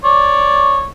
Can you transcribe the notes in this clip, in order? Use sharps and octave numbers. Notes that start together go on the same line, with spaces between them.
C#5 D5